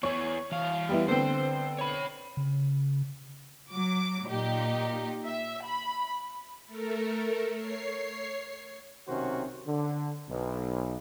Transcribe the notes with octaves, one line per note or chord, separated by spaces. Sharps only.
E2 G#4 C#5
E3 F5
G3 B3 E4
D3 B3 C4 C5
C#5 B5
C#3
F#3 D6
A#2 D#4 G4
E5
B5
A3 A4 A#4
C#5 C7
B1 C3 D#3 C#4 F#4 C5
D3
B1